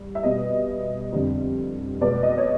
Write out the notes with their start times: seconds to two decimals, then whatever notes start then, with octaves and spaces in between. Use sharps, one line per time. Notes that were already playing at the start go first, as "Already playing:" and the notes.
Already playing: G3
0.15 E5
0.23 B2 G3 B3 D#5
1.12 F2 D3 G3 C4
2.01 B2 G#3 B3 D5
2.23 D#5
2.38 C#5